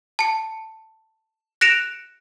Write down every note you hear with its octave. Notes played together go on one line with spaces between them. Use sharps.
A5 C#7
F#6 A#6 C#7 D7 E7 F7